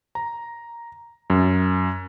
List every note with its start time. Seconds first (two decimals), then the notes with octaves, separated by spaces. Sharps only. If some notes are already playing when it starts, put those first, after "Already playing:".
0.15 A#5
1.30 F#2